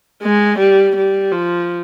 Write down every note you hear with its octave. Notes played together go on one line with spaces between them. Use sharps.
G#3
G3
G3
F3